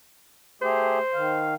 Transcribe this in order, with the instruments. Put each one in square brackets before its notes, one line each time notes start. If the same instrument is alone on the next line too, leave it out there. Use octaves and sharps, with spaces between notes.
[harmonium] A3 G4 G#4 [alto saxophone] C5
[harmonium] D#3 F5